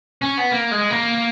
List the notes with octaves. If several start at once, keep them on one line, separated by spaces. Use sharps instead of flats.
C#4
B3
A#3
G#3
A#3